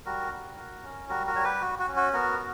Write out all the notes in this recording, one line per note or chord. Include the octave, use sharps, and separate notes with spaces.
G3 F#4 A#4
G3
F#4
C#4
G3 F#4 A#4
F#4 A#4
G3 C#5
G4 B4
F#4
F#4
C#4
F#4
B3 F#4 A#4
F#4